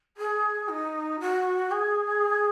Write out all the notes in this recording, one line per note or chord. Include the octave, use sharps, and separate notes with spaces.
G#4
D#4
F#4
G#4